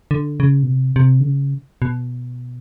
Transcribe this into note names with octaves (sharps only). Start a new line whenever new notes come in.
D3
C#3
B2
C3
C3
D3
C#3
B2